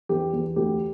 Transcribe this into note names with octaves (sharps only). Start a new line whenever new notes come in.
E2 G4
E2
D2 G4